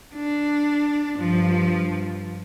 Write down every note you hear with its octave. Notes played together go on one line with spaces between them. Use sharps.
D4
G2 F3